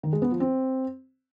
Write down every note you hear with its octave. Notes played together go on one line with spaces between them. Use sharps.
D#3
G#3
B3
F3
C4